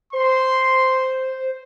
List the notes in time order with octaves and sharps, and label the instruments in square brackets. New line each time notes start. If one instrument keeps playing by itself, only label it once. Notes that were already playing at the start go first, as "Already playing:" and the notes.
[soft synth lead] C5 [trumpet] C6